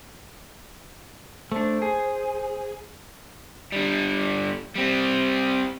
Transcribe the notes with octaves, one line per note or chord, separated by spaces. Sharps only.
A3 D4 C5
G#4
D3 G3
G3 C4